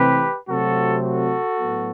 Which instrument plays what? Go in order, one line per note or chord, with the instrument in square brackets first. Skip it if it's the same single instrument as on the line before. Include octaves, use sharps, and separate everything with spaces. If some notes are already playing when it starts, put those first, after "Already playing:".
Already playing: [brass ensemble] C3 E3 A3 C4 G4 B4
C3 F#3 A3 C4 F#4 A4
F#4 A4
A2 F#3 B3